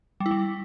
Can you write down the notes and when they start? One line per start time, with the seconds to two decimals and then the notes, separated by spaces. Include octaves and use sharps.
0.20 G3
0.26 E4
0.31 G3